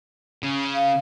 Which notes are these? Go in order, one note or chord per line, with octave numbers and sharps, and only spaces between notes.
C#3
F5